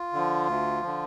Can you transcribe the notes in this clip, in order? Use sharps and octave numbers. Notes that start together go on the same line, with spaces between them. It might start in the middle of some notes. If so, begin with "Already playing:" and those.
Already playing: F4
D3 F3
D2
D3 F3